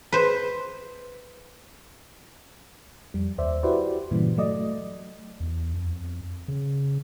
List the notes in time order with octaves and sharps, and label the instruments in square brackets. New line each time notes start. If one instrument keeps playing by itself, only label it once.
[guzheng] B4 C5
[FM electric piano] F2 G3
D#2 C5 D5 E5
E4 F#4 G4 B4 C5 D5
G2 A#2 C#3 E3 G3
F#3 A3 D5 D#5
[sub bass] E2
F2
C#3